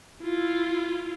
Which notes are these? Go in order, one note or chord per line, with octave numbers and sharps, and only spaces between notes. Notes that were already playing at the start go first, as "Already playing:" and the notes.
E4 F4